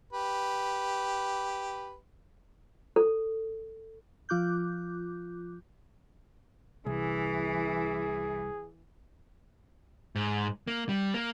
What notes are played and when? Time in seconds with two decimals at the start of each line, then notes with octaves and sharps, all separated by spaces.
0.13 G4 B4
2.96 A4
4.29 F3 F4 D6 F#6 G6
6.86 C2 E3 G#4
10.15 G#2
10.67 A#3
10.89 G3
11.14 A#3